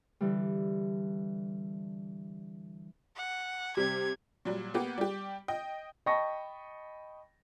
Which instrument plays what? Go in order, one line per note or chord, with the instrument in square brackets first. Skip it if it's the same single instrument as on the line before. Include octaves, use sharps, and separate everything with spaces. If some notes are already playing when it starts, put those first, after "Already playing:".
[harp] D3 E3 G3
[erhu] F#5
[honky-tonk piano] C3 G3 [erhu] G#6
[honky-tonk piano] A#2 F#3 G3
A#3 B3 G4
G3 G4
D#5 G5
[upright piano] D#5 G5 A5 B5 C#6 A#6